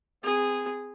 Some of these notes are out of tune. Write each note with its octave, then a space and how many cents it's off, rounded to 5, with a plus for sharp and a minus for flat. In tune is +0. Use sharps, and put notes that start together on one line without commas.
C4 -30 G#4 -10